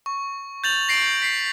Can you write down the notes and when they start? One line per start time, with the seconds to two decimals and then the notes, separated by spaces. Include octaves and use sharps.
0.06 C#6
0.64 G6 A6 F7 F#7
0.89 A#6 C7 D7 F#7
1.22 B6 C7